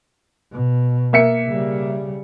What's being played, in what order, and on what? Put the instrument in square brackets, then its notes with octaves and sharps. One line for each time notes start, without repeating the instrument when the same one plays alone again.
[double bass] B2
[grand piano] A#3 E5 C#7
[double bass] C#3 G3